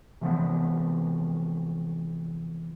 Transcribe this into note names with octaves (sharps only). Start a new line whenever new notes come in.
C3 E3 F3 B3